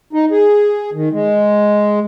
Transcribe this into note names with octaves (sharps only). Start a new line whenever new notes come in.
D#4
G#4
D#3
G#3